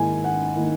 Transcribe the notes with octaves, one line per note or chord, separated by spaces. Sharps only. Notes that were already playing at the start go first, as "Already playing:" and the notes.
Already playing: G#2 D#3 A#3 E4 G#5
F#5
D#3 A#3 E4